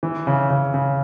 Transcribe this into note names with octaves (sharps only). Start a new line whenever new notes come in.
E3
C#3
C#3
C#3